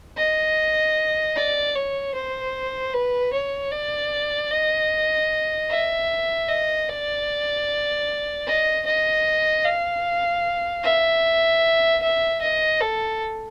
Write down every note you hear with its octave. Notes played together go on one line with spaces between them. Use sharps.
D#5
D5
C#5
C5
B4
C#5
D5
D#5
E5
D#5
D5
D#5
D#5
F5
E5
E5
D#5
A4